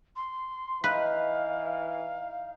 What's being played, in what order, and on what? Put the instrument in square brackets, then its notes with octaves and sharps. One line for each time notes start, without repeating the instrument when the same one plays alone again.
[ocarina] C6
[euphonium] E3 [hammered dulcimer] D#4 [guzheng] B4 [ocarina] F5